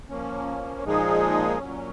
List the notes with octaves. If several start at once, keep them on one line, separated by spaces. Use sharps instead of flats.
F3 A#3 C#4
A#2 F3 G#3 D#4 G#4
A#2 F#3 C#4